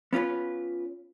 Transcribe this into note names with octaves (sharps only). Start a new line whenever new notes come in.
B3 C#4 F4 B4